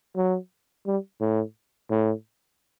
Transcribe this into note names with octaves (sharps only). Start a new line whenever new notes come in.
F#3
G3
A2
A2